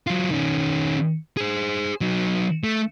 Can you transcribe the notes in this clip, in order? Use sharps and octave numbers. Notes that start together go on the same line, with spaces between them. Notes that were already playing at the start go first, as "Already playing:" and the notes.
F#3 F4
D#3 C#4
G#4 C5
F#3 D#4
A3